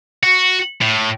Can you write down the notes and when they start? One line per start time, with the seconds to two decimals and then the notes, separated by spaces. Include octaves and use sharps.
0.23 F#4
0.81 A2